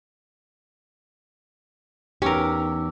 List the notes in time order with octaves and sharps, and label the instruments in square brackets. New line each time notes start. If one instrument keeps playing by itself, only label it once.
[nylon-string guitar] E2 G4 [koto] C#4 A#4 [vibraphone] D#4 D6 E6